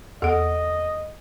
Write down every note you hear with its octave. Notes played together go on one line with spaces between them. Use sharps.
E2 A4 D#5 F#5